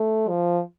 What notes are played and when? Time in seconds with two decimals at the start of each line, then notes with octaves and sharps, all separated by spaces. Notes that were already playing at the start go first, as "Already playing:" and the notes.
Already playing: A3
0.29 F3